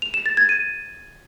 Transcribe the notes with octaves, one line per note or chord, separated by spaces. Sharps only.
F7
E7
A6
G#6
D#7